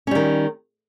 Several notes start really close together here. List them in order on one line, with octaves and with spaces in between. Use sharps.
C#4 G3 D#3